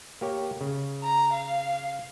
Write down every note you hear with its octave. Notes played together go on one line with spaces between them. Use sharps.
A#3 G4 C#5
C#3
A#5
F5